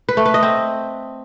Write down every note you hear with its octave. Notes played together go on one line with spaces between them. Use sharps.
B4
A3
B4
D#5
C4